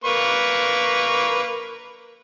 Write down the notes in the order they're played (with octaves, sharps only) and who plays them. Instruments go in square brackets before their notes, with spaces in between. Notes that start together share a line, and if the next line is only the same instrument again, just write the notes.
[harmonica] A#3 B4 C#6